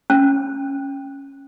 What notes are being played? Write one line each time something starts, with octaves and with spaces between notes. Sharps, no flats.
C#4